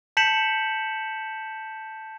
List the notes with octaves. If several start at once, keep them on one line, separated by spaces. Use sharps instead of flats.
A5 G6 B6 C#7 E7 F#7